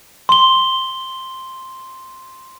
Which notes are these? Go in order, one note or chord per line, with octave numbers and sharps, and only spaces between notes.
C6 G7